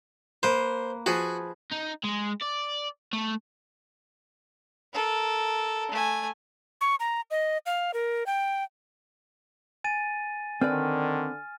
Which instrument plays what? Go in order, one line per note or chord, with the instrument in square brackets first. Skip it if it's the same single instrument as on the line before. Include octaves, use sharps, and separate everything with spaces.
[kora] A#3 B4 [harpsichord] C5
[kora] F3 G#4 B4 [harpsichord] F#4
[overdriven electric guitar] D#4
G#3
D5
A3
[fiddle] A4 A#4
A3 G#5
[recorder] C#6
A#5
D#5
F5
A#4
G5
[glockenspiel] G#5 A6 D#7
[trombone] D3 [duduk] D#3 [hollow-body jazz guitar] C4 B4 D5 [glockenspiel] F6